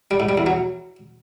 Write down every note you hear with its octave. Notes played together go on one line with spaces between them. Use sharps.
G3
G#2
G3
E2
F#3